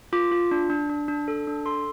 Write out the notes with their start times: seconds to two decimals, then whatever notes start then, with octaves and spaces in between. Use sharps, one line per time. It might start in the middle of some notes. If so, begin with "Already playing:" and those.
0.13 F4 D6
0.31 F4
0.51 D4
0.70 D4
0.90 D4
1.08 D4
1.28 A4
1.47 D4
1.66 A4 C6